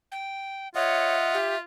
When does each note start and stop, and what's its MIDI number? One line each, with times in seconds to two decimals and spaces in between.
0.12 0.68 79
0.75 1.62 65
0.75 1.16 73
0.75 1.37 75
0.75 1.58 76
0.75 1.37 78
1.34 1.55 67